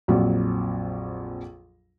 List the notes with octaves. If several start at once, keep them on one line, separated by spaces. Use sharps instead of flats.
A#1 F2 F#3